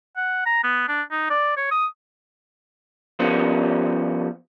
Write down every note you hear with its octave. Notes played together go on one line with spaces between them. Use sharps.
F#5
A#5
B3
D4
D#4
D5
C#5
D#6
F3 G3 B3 C#4 A#4 C5